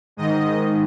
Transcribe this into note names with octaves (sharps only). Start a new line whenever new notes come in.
G#2 D#3 D#5